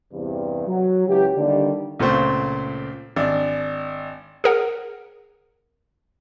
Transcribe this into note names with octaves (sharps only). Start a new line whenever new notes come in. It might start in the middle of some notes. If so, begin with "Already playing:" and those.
E2 G2 C3
F#3
C#2 E3 F#3 G4
D3 D#3 G3 A#3 D4 D#4
C#2 A#2 A3 C4 C5 C#6
G#1 D4
G#4 A#4 F#5